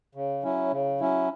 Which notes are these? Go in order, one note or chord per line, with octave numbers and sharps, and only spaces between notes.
C#3
F#3 C#4 E4
C#3
F#3 C#4 E4